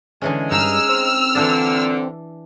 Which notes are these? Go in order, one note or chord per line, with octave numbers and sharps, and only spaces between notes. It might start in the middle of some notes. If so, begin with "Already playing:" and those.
D3 E3 G#3 C#4
G2 D#4 G#4 E6 F6
C4
A#2 D3 E3 D4 D5